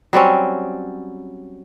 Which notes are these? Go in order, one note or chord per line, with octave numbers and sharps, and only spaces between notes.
F#3 G3 C4 C#4